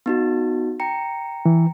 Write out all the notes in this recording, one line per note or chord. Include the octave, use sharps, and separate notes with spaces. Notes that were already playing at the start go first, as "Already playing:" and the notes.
B3 D#4 F#4
G5 A#5 C#7
E3